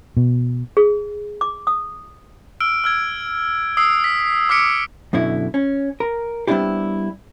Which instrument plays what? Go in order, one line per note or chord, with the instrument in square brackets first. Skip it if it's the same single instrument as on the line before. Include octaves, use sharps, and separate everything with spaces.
[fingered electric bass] B2
[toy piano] G#4
D6
D#6
[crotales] E6 F6 D7
E6 F6 G#6
D#6 E6 C7
B6
D6 D#6 F6 B6 C#7 D7
[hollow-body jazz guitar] F#2 B2 D3 E4
C#4
A#4
G3 B3 C4 D4 E4 G4